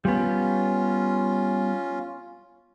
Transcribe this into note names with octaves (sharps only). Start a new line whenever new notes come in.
G3 B3 C#4 F4